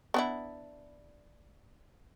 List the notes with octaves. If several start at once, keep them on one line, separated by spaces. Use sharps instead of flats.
B3 D4 E4